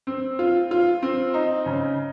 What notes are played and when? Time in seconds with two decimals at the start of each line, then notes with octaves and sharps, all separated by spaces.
0.07 C4
0.39 F4
0.71 F4
1.02 C4
1.34 D#4
1.66 C#3